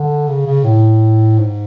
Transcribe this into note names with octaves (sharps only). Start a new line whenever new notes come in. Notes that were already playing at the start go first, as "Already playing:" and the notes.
Already playing: D3
C#3
C#3
A2
G#2